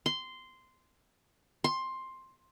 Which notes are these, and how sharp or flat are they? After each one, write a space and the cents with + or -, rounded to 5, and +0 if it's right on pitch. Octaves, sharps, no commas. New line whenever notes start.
C6 -10
C6 +10